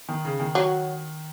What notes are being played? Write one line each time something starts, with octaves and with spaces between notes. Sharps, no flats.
D#3
C#3
D#3
F#3